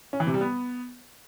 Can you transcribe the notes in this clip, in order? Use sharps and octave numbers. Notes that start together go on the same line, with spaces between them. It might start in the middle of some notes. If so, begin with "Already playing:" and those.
C#4
E3
C3
G3
B3